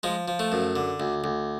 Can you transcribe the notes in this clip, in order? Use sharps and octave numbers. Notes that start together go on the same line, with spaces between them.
F3 G#3
F3
A3
F#2
D3
D2
D2